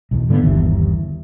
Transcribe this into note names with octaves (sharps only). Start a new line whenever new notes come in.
B1 E2
G#2 D3 A#3 B3
G1 D#2 E3